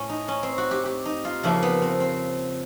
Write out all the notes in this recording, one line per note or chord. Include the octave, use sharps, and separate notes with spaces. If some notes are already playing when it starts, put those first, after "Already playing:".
Already playing: A2 C#4
D#4
C#4
C4
F#4
G4
G4
D#4
F4
F2 C#3 F3 A#3 E4
B3
C4
C4